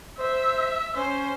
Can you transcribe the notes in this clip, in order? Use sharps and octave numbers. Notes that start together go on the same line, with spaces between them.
C5 E5
C#4 C5